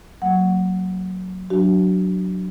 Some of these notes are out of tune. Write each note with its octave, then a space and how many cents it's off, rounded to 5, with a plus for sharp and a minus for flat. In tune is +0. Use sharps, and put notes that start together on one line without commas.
F#3 +0 A#3 -25 F#5 +0
F#3 +0 D4 +0 F#4 +30